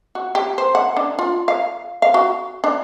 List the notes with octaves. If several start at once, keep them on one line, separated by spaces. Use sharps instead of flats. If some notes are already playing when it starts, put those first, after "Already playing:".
F#4
G4
C5
F#5
D4
F4
F5
F5
F#4
D4